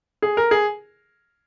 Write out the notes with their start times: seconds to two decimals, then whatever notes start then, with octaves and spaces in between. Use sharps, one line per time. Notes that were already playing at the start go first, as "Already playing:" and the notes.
0.22 G#4
0.37 A#4
0.51 G#4